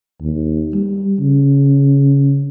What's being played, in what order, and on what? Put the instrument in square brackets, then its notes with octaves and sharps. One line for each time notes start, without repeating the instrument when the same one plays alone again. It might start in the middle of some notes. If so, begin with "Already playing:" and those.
[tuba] D#2
G3
C#3